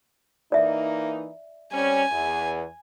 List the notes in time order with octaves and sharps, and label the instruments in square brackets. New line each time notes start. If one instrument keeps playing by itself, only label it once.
[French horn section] E3 A#3 D#4 [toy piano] D5 E5
[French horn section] G3 C4 C#4 [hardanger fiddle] G#5
[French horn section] E2